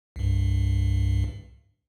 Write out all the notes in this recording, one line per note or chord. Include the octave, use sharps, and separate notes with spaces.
C2 G2